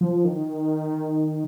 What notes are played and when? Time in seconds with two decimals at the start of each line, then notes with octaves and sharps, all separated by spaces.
0.01 F3
0.25 D#3